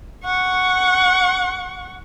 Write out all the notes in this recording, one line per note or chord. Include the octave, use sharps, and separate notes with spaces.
F#5 C#6